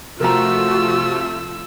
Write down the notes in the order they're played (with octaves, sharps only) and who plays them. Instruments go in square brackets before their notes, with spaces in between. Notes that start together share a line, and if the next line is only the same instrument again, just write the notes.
[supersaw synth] C3 F3 A3 [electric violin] F4 E6 [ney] F#4 [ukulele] A#4 A#5